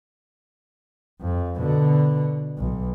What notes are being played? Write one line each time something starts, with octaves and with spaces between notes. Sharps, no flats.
F2
B2 D3
B1